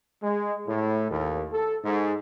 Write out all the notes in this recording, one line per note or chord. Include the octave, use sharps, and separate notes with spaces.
G#3
A2
D#2
A4
G#2